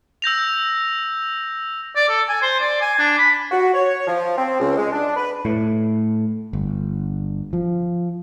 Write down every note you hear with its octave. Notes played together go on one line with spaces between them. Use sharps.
E6 G6 A#6 F7
D5
A4
G#5
C5
D5
G#5
D4
B5
F#4
C#5
F3
C4
C#2
G#3
D4
B4
A2
G1
F3